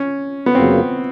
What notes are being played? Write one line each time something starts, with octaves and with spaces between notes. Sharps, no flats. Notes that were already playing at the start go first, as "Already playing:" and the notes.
Already playing: C#4
B3
F#2 C#3 F#3 A#3 C4